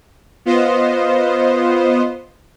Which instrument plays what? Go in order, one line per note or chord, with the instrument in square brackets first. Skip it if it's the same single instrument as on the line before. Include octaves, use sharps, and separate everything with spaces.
[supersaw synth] B3 F4 C5 D#5